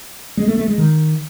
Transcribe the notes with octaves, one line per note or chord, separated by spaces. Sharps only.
G#3
A3
A3
G#3
D#3